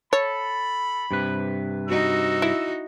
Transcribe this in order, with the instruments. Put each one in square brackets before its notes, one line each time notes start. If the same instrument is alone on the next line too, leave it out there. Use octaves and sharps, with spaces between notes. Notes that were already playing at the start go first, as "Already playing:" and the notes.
[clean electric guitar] A4 [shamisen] C#5 [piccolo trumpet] B5
[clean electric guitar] G2 C3 B4
[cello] D#4 F#4 [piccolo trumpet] E6
[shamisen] E4